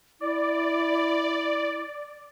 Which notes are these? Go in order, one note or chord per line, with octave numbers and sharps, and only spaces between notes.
E4 D5